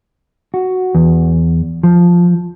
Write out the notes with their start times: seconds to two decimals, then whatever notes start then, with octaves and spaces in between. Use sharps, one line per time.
0.54 F#4
0.95 E2
1.83 F3